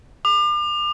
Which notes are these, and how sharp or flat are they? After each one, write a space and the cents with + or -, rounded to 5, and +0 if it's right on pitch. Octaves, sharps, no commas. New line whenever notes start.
D6 +40